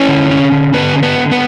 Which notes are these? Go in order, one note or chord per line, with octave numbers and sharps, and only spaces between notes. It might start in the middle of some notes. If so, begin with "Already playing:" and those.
Already playing: C#4 E4 C#5
D3
C#4
D3
D3 B3 B4
C#4
B3 B4
D3
B3 B4